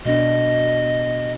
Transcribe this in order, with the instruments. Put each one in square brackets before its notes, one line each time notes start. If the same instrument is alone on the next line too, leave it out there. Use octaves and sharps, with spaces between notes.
[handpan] B2 B3 D4 [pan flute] D#5